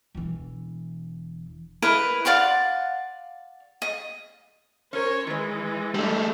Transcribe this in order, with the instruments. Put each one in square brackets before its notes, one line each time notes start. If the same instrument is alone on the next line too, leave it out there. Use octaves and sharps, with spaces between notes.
[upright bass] E1 E3
[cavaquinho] E4 A#4 B4 D#5
D5 F5 F#5 C6
D#5
[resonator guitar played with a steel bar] C#4 A#4 [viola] C5 C#5
[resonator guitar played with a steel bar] D#3 B4 [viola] E3 G#3
[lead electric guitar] G3 A3 [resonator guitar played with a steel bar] D4